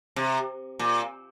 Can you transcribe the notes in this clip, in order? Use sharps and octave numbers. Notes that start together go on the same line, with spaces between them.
C3
A#2